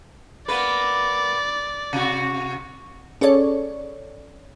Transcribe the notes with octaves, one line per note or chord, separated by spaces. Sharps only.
A#3 B3 B4 D5
C3 F#4
C#4 G#4 A4 C#5 D5